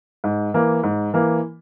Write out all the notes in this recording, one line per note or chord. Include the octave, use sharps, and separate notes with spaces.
G#2
E3 A#3
G#2
E3 A#3